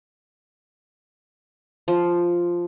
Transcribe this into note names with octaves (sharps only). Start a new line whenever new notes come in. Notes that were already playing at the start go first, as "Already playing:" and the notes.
F3